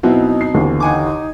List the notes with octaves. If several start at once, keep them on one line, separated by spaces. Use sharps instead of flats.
B2 F#3 B3 C4 D#4 E4
C7
D#2 D3 E3
D#4 F#5 G#5 D6